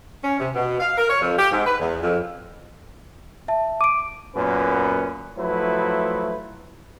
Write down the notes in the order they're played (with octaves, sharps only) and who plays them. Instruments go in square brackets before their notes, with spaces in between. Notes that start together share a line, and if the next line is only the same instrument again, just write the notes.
[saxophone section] C#4
C3
B2
F5
A#4
C#5
F2
G4
G#2
B4
E2
F2
[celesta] E5 A5
[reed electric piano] D6 [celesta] D7 D#7
[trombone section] F#2 A#2 B3 C#4 B4
F3 F#3 A3 E4 B4